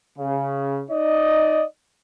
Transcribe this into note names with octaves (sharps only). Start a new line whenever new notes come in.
C#3
D#4 D5 D#5